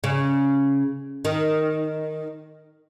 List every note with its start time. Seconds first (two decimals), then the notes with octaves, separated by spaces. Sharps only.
0.04 C#3
1.25 D#3